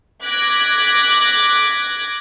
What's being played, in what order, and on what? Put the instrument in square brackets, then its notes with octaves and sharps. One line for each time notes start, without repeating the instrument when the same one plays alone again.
[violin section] D6 F#6 G#6 A#6 B6